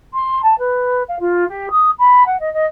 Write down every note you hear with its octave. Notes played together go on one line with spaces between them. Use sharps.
C6
A5
B4
F5
F4
G4
D#6
B5
F#5
D#5
D#5